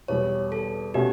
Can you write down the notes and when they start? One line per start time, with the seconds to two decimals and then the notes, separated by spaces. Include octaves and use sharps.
0.08 E2 B2 G3 C#5
0.52 A4
0.94 B2 A3 C#4 F#4 G4